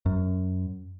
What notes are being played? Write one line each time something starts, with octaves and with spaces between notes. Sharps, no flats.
F#2